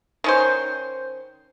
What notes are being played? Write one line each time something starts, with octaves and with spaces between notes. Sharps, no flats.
D#3 C#4 C5